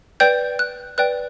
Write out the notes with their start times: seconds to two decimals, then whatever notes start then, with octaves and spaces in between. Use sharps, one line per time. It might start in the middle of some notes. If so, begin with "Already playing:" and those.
0.20 B4 D5 G5 G6
0.59 F#6
0.98 B4 D5 G5 F#6